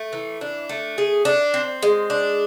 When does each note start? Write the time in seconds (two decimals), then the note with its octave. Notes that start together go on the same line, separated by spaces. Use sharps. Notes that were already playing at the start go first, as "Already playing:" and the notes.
Already playing: A3
0.13 E3
0.41 D4
0.69 A3
0.98 G#4
1.25 D4
1.54 C4
1.83 G#3
2.10 D4